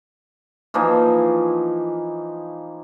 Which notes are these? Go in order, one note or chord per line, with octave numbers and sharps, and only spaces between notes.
E3 F3 A#3 D#4